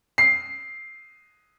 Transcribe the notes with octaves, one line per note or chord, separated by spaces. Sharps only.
C7